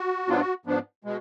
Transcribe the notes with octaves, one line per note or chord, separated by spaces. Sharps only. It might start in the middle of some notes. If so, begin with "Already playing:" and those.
Already playing: F#4
G#2 F#3 B3 D4 F4
F#4
G#2 F3 B3 D4
B2 G#3